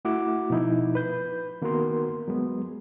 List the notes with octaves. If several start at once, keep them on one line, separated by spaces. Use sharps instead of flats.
A3 E4 F#4 F#5 D6
B2 F3 D#4 E4
B4 G6
D#3 A#3 B3 F#4 A#4 C6
F#3 G#3 B3